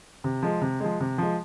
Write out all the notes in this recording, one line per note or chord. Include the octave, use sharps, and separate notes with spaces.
C3
F3 G#3
C3
F3 G#3
C3
F3 G#3